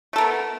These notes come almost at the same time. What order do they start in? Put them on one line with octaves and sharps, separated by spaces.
A3 A4 A#4 B3